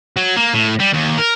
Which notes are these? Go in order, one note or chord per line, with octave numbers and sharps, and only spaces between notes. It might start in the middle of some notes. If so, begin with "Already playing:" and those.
F#3
A#3
A2
G3
D#2
A#4